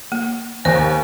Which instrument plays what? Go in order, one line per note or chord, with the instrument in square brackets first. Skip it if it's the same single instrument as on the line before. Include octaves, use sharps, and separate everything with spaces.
[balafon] A#3
[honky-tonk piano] D#2 [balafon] C5 [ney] G#5